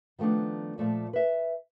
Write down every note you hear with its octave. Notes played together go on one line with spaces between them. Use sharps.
D#3 F3 A3 B3 D4
A#2 F3 A3 D5
B4 E5